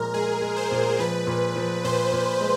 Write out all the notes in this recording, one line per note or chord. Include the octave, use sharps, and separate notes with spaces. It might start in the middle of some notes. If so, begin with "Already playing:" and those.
Already playing: A#2 F3 G#3 A#4
G#3 G#4
G#3
C5
A#2
F3 B4
A#2
F3
A#2 C5
A#2
G#3